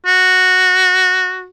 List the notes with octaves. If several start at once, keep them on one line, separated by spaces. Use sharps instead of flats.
F#4